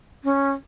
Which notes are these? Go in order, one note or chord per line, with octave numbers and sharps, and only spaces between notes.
C#4